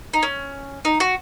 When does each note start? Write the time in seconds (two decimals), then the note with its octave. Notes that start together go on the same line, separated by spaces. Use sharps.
0.13 D#4
0.23 C#4
0.85 D#4
1.00 F#4